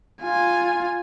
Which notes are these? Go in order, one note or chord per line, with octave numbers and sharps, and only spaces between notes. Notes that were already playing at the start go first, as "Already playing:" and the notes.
F4 G#5